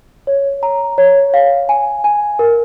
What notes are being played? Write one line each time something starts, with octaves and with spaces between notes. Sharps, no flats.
C#5
A#5
C#5
F5
G#5
G#5
A#4